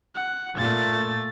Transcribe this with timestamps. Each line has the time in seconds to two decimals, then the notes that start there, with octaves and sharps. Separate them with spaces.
0.15 F#5
0.57 A#2 A3 A6